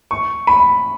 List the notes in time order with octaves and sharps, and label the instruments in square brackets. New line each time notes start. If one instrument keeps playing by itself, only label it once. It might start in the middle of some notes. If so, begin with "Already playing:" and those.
[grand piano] C#6
B5